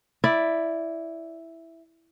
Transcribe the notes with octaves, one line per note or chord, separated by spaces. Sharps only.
E4 D5